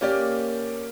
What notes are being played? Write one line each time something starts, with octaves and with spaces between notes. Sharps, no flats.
A#3 C#4 G4 D5